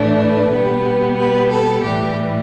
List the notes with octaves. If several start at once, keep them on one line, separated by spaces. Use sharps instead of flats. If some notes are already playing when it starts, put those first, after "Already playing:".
Already playing: A2 E3 A3 D4
B4
B2 G3 B3
B4
A4
A2 E3 G3 G4